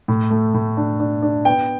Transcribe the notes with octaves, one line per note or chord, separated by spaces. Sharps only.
A2
A3
A2
D4
D4
D4
B3 G5